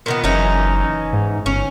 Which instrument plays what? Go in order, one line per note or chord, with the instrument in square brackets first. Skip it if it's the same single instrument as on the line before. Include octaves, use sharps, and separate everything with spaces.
[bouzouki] A#2 D#3 B3
[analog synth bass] F#1 [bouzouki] E3 C#4 D#4
[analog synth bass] G#2
[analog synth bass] G1 [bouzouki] C#4